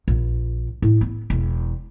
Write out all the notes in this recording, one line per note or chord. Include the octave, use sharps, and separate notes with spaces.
A#1
A2
B3
E1